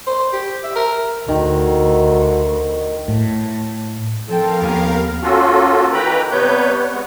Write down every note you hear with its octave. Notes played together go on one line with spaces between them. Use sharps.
C5
G4
E5
A#4
D2 D#3
A2
F3 C4 A4 A#4 F5 G5
D#2 A#3 B3 G4 G#5
A#3 C#4 F4 F#4 A4
D#3 E3 B4 G5 A#5 B5
C3 G3 B3 B4 C#5 G6
G#3 B3